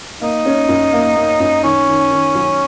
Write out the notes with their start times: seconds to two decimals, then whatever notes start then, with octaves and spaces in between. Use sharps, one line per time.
0.21 A#3 D#4
0.45 C#4
0.68 F#2
0.93 A#3
1.16 A#3
1.40 F#2
1.63 D#3 C#4
1.88 D#3
2.11 D#3
2.35 F#3